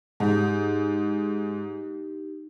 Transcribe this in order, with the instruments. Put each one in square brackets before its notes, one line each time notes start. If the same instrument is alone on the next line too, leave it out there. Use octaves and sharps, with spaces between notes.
[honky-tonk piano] G#2 [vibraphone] D#4 G4